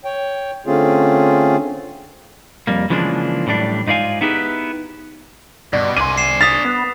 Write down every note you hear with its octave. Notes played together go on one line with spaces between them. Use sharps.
C#5 G5
D3 A3 C4 C#4 F4 G#4
F2 G3 A#3
C#3 E3 F3 G#3 A#3 D4
F#2 A2 E3 G3 D4
G#2 D#4 F4 D5 F5 G#5
B3 D#4 E4 G4 G#4 B4
G2 B2 D5
C2 D4 G#5 C6 D#7
C7 E7
D#6 A6 B6 F7
B3